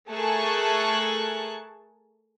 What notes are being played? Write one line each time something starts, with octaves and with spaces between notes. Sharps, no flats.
A3 G#4 A#4 A5 C#6 F#6